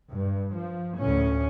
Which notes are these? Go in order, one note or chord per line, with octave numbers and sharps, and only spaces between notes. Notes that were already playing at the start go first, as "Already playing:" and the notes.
G2
F3
D2 A2 C#4